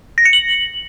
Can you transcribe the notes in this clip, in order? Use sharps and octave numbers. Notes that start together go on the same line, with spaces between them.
A#6
C#7
F#7